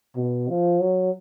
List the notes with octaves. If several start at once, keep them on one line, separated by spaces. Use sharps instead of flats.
B2
F3
F#3